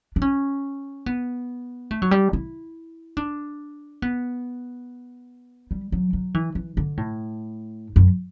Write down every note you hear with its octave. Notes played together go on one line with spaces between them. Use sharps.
D4
C#4
B3
A3
F#3
G3
E4
D4
B3
G3
F#3
F#3
E3
E3
D3
A2
F#2